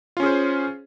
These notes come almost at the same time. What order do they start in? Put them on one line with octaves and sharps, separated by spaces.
F4 C#4 G#4 C5